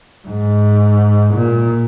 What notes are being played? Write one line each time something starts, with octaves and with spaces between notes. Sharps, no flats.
G#2
A#2